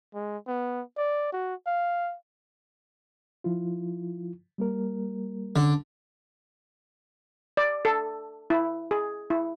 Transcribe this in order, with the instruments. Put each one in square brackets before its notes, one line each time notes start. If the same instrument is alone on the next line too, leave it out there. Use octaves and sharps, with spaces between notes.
[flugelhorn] G#3
B3
D5
F#4
F5
[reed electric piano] F3 E4 F4
G3 A#3 A#4
[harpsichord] D3 [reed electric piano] C#4
[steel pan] D5
A4
E4
G#4
E4